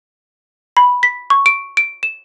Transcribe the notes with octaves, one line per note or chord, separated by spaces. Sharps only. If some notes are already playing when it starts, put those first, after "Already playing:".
B5
B6
C#6
D7
D7
E7